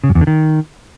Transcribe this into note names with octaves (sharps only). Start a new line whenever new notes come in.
C#3
F#2
E2
D3
D#3